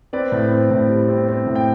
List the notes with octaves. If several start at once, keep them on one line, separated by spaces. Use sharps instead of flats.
C4 B4 D5
A2
C4
A2
G3
C4
C4
A2
G5